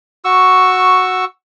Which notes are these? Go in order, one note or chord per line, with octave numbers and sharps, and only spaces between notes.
F#4 C#6 E6